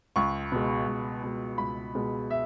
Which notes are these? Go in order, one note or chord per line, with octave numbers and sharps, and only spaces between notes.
C#2 C#6
B2 G#3
C#2
B2 G#3
C#2 B5
B2 G#3
E5